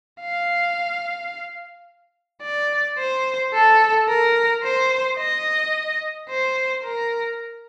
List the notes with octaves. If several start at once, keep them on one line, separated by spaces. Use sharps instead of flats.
F5
D5
C5
A4
A#4
C5
D#5
C5
A#4